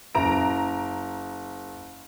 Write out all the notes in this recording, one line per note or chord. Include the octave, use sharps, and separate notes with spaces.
F#1 A#5 D7